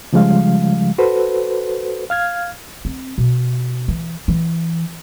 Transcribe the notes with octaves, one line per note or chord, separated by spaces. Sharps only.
C#3 F3 G3 G#3 F5
F#4 A4 B4 C5
F5 F6 G#6
C4
B2
E3
E3